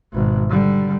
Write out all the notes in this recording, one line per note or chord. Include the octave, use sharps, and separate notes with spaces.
G#1 B2
D3 G3